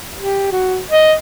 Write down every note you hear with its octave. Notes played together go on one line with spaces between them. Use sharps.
G4
F#4
D#5